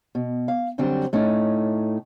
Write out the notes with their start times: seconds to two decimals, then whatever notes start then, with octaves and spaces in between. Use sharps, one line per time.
0.15 B2
0.48 F5
0.78 F#2 D3 F#3 G3 C4
1.13 A2 A3 C#4 D#4